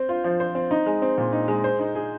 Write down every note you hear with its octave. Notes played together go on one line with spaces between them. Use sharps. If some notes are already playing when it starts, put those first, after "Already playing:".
Already playing: C4 C5
F4
F3
C5
C4
D#4
G#3
C4
A#2
D#4
G#3
C5
D#4
G#4